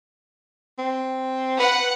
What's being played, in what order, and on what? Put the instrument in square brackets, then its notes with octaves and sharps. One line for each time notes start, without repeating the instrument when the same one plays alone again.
[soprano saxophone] C4
[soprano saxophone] B4 [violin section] F#5